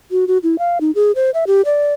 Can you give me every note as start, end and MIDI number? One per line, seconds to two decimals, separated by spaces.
0.11 0.27 66
0.28 0.38 66
0.43 0.56 64
0.59 0.78 77
0.81 0.91 63
0.95 1.12 68
1.16 1.30 72
1.34 1.44 76
1.47 1.62 67
1.65 1.93 74